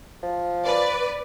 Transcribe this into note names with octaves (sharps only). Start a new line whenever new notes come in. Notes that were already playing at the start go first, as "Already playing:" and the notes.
F3
B4 D5